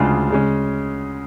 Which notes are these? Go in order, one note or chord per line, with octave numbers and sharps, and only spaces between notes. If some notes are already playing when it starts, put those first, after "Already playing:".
Already playing: D2 C#3 G#3 D4 F4
C#3 G#3 C#4